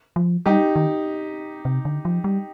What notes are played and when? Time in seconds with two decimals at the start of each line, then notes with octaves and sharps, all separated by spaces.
0.16 F3
0.46 G3 D#4 G4
0.76 D#3
1.65 C3
1.85 D3
2.05 F3
2.24 G3